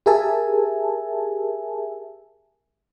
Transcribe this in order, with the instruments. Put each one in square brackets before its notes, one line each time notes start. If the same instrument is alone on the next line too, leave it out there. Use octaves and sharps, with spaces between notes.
[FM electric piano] G4 G#4 A#4 E5 G#5 A5